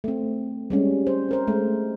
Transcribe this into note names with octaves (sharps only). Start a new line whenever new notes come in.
A3 C4
G3 G#3 C#4
C5
C4 A#4 C5
G#3 A3